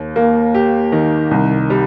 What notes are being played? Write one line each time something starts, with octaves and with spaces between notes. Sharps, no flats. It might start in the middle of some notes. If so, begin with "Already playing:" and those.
Already playing: D#2
A#3
G4
D#3
C2
G3